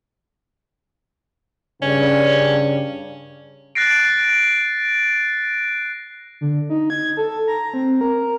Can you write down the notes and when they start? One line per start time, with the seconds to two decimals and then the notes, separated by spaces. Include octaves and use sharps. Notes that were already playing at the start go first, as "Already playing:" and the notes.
1.82 G2 C#3 C#4 D5
3.75 F#6 A6 A#6 C7 D7
6.41 D3
6.70 D#4
6.90 G#6
7.17 A4
7.48 A#5
7.74 C4
8.01 A#4